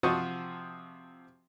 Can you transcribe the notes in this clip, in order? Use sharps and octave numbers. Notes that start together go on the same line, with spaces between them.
C3 F3 F#4 D#5 A5 C#6